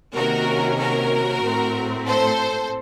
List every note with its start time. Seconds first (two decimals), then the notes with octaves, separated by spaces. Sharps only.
0.15 C3 D#3 A#3 C#4 F#4 A#4
0.79 F#4 A#4
1.43 A2 A3 C4
2.07 A4 C5